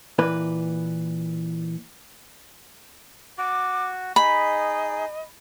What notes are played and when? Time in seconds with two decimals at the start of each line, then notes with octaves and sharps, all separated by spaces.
0.19 A#2 E3 B4
3.38 F#4 D6
4.16 D#4 G#4 D#5 B5